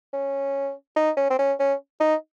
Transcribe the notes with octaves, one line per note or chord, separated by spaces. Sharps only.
C#4
D#4
C#4
C4
C#4
C#4
D#4